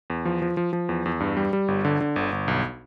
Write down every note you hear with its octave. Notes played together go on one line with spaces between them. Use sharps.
E2
F3
F3
F3
F3
E2
E2
G2
G3
G3
G1
D3
D3
G1
G1
B1